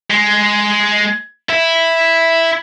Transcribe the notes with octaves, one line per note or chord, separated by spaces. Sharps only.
G#3
E4